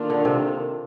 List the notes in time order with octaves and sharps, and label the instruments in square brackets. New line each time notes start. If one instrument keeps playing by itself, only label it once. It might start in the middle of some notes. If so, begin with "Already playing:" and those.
Already playing: [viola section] D#3 A#3 D4 F4 A4
[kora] D3
C3